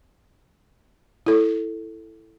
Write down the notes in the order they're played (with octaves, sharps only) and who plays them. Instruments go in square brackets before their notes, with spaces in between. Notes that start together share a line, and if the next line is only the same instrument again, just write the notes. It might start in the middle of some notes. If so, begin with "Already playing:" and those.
[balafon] E4 A4